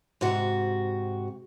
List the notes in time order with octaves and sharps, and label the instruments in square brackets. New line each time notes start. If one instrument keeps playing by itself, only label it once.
[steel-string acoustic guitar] G#2 C3 F#4